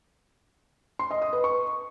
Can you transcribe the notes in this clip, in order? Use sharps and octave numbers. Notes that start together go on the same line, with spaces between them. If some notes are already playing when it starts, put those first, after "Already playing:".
C6
D#5
D#6
B4
C#6